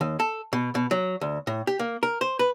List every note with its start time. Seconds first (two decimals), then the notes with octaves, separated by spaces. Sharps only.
0.01 D#2
0.20 A4
0.53 B2
0.75 B2
0.91 F#3
1.21 D2
1.47 A2
1.67 G4
1.79 A#3
2.03 A#4
2.21 C5
2.39 B4